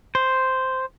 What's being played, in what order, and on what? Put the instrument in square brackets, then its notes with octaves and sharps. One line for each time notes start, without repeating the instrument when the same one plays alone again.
[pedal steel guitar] C5